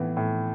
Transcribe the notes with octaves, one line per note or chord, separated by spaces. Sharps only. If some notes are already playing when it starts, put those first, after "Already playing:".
Already playing: A2 E3 B3
A2